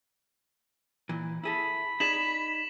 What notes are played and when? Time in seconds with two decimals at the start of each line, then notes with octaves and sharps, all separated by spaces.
1.09 A#2 E3
1.44 E4 G#4 A4 B5
2.00 D#4 G#4 D5 B6 E7 F#7